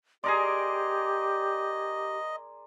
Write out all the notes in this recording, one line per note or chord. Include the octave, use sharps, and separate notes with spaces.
G4 G#4 A#4 D5 D#5 C6